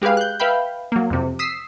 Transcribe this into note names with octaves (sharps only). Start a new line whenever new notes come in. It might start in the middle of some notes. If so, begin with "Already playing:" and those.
G#3 G4 G#4 B4 F5
F#6 G6
B4 E5 F5 G5 B5 G6
F#3 A#3
F2 C3
D#6 E6 B6 C7 E7